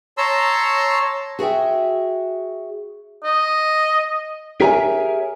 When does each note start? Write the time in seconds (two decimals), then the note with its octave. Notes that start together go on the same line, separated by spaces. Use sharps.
0.18 C#5 A5 A#5 C6 E6
1.39 F#4 G#4 A#4 E5 G5
3.24 D#5
4.61 G4 G#4 A#4 C#5 E5 G#5